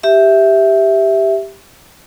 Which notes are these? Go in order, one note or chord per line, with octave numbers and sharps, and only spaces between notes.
G4 E5